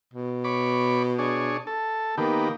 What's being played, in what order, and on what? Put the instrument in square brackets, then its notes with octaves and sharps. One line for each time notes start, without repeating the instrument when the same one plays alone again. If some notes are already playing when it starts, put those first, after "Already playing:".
[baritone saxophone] B2
[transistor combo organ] C#5 B5 D6
D4 G#4 C#5
A4
[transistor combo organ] D#3 B3 G4 [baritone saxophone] A#3